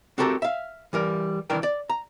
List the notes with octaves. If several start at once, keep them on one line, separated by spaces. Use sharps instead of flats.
C4 F#4 G4 A4 A#4
E5 F5
E3 G3 A#4
C2 D#3 E3 D4 A#4 G5
D5
A#5